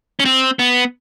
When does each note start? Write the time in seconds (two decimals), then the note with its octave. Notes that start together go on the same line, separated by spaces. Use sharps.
0.20 C#4
0.25 C4
0.59 B3